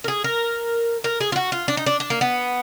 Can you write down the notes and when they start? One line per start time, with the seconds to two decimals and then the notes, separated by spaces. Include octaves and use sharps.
0.04 A#4
0.08 G#4
0.24 A#4
1.04 A#4
1.21 G#4
1.32 F4
1.36 F#4
1.52 F4
1.68 D4
1.77 D#4
1.86 D4
2.00 D4
2.10 A#3
2.21 B3